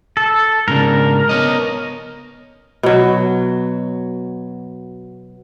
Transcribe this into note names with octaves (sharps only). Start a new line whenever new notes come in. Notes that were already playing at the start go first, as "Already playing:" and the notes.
A4
G#2 C#3 D4 A#4
B3 C#5 D#5
B2 F#3